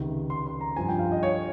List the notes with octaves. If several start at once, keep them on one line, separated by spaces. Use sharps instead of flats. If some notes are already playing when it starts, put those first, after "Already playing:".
Already playing: C#2 C3 D#3
C6
C6
A#5
G2 F3 C4 G#5
G5
F5
D#5
C#5